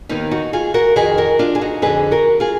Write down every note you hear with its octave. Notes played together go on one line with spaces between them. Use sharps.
D#2 D#3 B3 D#4
D#4 F#4
F4 G#4
F#4 A#4
F2 D#3 G#4 B4
F#4 A#4
D4 F4
G#4
D#4 F#4
F2 D3 G#4 B4
F#4 A#4
F4 G#4